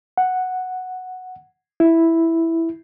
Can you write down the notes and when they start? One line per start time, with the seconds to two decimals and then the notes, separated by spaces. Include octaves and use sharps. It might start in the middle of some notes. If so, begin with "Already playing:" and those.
0.18 F#5
1.80 E4